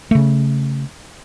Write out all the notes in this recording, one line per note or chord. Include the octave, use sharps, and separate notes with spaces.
C#3 A3